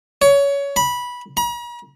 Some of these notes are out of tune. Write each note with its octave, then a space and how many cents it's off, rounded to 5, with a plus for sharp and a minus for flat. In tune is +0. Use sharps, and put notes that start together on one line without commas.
C#5 +20
B5 -15
A#5 +45